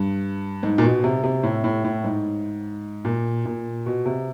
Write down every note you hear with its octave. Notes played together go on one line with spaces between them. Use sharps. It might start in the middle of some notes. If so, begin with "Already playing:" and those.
Already playing: G2
G#2
A#2
B2
C3
C3
A2
A2
A2
G#2
A#2
A#2
B2
C3